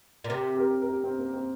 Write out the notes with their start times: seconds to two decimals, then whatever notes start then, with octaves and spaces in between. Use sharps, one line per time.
0.24 A#2
0.29 C3 A#4
0.55 G4
0.59 A#4
0.82 A#4
0.89 G4
1.04 C4
1.18 A#3
1.33 C4